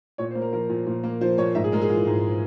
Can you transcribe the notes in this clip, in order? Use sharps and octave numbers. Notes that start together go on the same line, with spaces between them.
A#2 C#5
C5
A#3
A#4
F3 A#4
A#2
A#2
A#3
F3 C5
A#2 C#5
G#2 E5
G#4
G#3 A#4
G#4
E3 F4
G#2